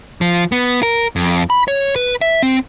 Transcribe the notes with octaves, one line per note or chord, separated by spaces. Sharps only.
F3
B3
A#4
F2
B5
C#5
B4
E5
C4